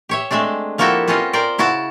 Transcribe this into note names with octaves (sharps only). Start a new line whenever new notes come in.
G4 C#5 E5
G#3 A3 C4 D4
F3 A#3 E4 F#4 G4 A4
C4 C#4 F4 B4 D#5 F#5
A#4 C5 D5 G5
C#3 E4 F#4 F#5 A5